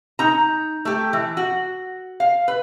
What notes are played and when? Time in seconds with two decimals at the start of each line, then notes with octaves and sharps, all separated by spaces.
0.19 D#4 A#5
0.85 A3 G4
1.13 E3
1.37 F#4
2.20 F5
2.48 B4